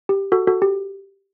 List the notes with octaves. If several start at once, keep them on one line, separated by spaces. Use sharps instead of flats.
G4
F#4 A4
F#4 A4
G4